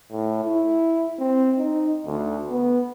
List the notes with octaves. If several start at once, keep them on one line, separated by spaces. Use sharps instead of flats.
A2
E4
C4
D#4
D2
B3